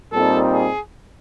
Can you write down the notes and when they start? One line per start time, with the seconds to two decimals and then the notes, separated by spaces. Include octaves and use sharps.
0.12 A#2 G3 C4 D#4 A4
0.52 G#4